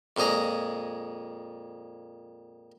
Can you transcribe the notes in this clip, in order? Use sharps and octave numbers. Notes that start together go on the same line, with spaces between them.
F2 A#2 G#3 G#4 A#5